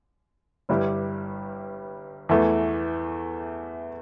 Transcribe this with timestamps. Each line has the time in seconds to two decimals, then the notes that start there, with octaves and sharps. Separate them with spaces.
0.69 G1 G2 G3 E4 G4
2.29 E2 E3 A3